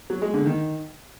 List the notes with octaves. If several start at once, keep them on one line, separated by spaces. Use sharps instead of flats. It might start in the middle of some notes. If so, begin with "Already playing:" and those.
F#3
G#3
D3
D#3